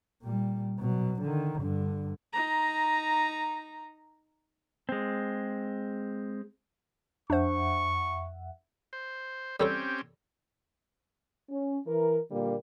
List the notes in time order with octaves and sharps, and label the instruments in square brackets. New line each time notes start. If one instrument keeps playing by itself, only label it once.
[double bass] A#2 G3
B2 F#3
D3 D#3
G2 D3
[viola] D#4 A#5
[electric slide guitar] G#3 C4
[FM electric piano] F2 E5 F#5 [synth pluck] D4 C5 [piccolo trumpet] C#6
[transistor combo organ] C5
[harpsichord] G3 A4 C#5 [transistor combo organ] C4 C#4 G4
[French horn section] C#4
E3 A#4
A#2 D3 G3 A#3